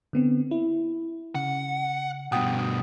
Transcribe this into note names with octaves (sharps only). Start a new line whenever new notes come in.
D3 B3 C4
E4
C#3 F#5
G2 B2 F#5 G5 D#6